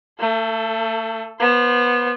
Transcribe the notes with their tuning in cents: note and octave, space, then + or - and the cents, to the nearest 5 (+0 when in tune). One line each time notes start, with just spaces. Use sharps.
A3 +35 A4 +0
B3 -20 C5 +0